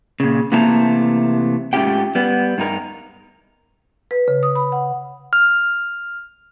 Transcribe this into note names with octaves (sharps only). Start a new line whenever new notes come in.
A#2 C#3
C3 E3 A3 A#3 A5 A#5
G#2 A3 C#4 F4 G4 G5
G3 B3
G2 D#4 A#4
B4
C#3
D#6
B5
F#5
F6